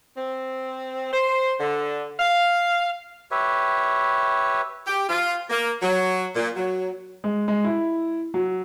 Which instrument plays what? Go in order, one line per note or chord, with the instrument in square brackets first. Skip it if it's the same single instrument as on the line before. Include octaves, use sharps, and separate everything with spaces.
[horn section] C4
C5
D3
F5
[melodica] G4 B4 C#5 E5
[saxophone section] G4
F4
A#3
F#3
A#2
F#3
[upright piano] G#3
G#3
E4
F#3